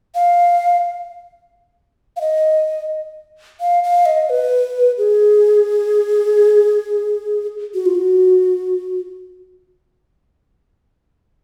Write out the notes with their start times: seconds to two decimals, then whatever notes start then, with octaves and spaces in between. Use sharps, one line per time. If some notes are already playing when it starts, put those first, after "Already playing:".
0.15 F5
2.16 F5
2.21 D#5
3.61 F5
3.84 F5
4.06 D#5
4.30 B4
4.98 G#4
7.74 F#4
7.86 F4
7.95 F#4